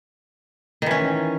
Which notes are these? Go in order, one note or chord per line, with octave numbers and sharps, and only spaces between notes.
D#3 E3 C#4